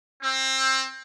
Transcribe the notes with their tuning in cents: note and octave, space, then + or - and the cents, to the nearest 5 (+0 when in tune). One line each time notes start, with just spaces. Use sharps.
C4 +20